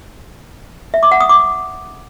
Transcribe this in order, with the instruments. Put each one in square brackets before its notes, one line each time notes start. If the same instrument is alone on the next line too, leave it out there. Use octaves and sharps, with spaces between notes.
[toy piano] E5
D6
F#5
D#6
D6